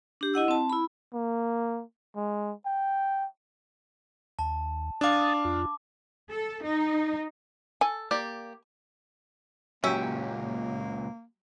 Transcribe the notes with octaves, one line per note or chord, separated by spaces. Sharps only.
D4 G4
E4 D#5 F#5 E6
C4 A5
E4 B5
A#3
G#3
G5
D#2 A5
D4 F5 A5 D6 D#6 A6
F2 F4
A4
D#4
A4 G#5
A#3 G4 D5
C#2 A#2 F#3 G3 A#3 C#4 E5 G5